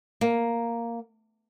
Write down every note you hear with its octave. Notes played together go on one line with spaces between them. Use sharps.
A#3